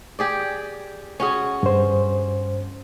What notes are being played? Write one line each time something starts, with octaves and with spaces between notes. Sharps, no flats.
G4 G#4 D5
C#4 F#4 G#4
G2 C5